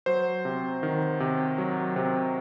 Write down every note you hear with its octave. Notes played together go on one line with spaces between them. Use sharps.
F#3 C5
C3
D#3
C3
F#3
C3